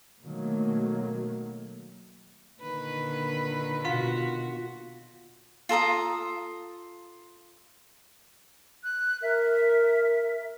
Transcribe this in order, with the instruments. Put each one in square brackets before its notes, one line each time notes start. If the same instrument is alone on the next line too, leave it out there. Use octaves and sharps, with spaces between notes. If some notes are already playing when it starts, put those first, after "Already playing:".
[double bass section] B2 D#3 F#3 A3 A#3
[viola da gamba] A#2 D3 D#3 [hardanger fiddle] B4
[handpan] B2 F#5 [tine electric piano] F4 B6 [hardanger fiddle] F#4
[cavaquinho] F4 A4 A#5 D#6
[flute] F#6
[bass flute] A#4 [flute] E5